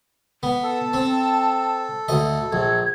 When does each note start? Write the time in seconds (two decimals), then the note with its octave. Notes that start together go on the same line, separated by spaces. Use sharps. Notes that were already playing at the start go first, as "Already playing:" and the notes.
0.43 B3
0.63 A4 A5
0.94 C4
2.08 D2 D#5
2.53 A#1 G#6